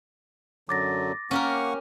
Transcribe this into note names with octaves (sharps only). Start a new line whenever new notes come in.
F#2 D3 F#3 D6 A6 A#6
A#3 C#4 G4 A#4 F#5 C#6